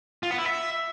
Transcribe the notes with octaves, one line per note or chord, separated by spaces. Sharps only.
F4
B3
E4
E5